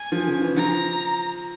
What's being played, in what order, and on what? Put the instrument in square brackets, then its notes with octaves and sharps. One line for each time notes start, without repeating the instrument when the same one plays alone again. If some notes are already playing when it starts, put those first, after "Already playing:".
Already playing: [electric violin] G#5
[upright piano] F3
C#3
E3
[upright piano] F3 [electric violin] A#5